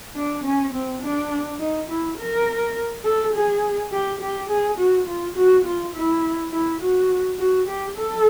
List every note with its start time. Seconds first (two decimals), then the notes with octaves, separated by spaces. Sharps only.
0.15 D4
0.44 C#4
0.73 C4
1.02 D4
1.59 D#4
1.88 E4
2.18 A#4
3.04 A4
3.33 G#4
3.91 G4
4.20 G4
4.49 G#4
4.78 F#4
5.07 F4
5.36 F#4
5.65 F4
5.94 E4
6.52 E4
6.81 F#4
7.39 F#4
7.68 G4
7.97 A4